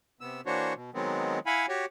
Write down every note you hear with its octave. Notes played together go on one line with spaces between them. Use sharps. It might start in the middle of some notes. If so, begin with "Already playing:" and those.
C3 B3 E6
E3 A#3 D4 F#4 C5 C#5
B2
D#3 F#3 G#3 B3 C4
E4 F5 F#5 G#5 B5
F#4 G4 C#5